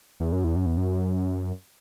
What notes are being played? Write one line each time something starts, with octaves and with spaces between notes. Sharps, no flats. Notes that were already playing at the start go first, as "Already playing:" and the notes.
E2
F#2
E2
F#2
E2
F#2